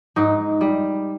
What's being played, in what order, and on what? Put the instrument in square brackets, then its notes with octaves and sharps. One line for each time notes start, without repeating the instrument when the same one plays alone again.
[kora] G#2 D#4
G3